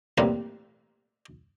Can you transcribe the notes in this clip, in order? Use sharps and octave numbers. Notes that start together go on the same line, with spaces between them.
A1 A2 G3 A#3 C4 B4